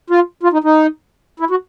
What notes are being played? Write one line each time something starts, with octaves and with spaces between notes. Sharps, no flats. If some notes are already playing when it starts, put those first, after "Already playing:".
F4
F4
D#4
D#4
E4
F#4